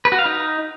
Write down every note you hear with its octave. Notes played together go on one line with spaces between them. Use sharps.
B4
F#4
F5
D#4